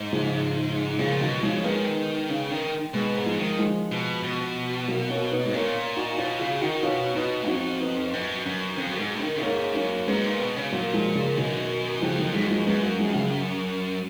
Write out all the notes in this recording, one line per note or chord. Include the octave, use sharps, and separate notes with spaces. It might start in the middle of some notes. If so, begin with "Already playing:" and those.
Already playing: G#2
C#3 F3
A#2 C#3 F3
B2 D#3 F#3
C#3 F3 G#3
C#4
D#3 G#3 B3
C#3
D#3
B2 G#3 B3
G#2
F3 G#3
D#3
F3 G#3
B2
B2
F#3 A#3
A#3 C#4
B3 D#4
G#2
A#2 A#3 C#4
D#4 F#4
B2 C#4 F4
C#3 F4 G#4
D#3 D#4 F#4
B2 C#4 F4
B2 B3 D#4
F2 D#4 F#4
B3 D#4
F#2
F#2
F2
F#2
G#2
D#3
G#2 A#3 C#4
F#2 A#3 C#4
G#2 G#3 B3
A#2
B2
C#3
A#2 F#3 A#3
F3 G#3
C#3
F#2 B2 D#3
F2 C#3 F3
D#3 F#3
F#2 F3 G#3
F3 G#3
F#2 G#3 B3
F#3 A#3
F3 G#3
C#3